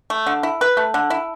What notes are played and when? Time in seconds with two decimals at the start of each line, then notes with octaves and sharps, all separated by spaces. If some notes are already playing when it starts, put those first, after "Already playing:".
0.10 A3
0.27 D3
0.43 E4
0.61 B4
0.77 A3
0.94 D3
1.10 E4